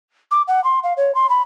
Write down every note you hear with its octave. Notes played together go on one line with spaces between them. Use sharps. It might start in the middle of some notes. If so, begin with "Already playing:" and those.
D6
F#5
C6
F5
C#5
C6
B5